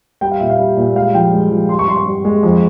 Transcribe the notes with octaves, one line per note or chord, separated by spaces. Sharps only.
G3 G5
F5
A#2 E5
F5
G3
A#2
G#3 F5
F3 G5
G#3
F3
G2 C6
C#6
G2 C6
C#6
G2
G#3
F2